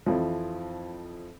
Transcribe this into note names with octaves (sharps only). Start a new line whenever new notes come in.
F2 E3 F3